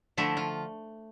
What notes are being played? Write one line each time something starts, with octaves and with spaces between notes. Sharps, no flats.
D3 F3 A3 E4
F4